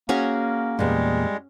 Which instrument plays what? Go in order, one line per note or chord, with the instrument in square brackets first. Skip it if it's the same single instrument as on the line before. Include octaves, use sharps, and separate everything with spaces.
[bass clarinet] A#3 [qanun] C#4 F#4 G#4
[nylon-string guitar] E2 A#2 [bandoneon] G3 G#3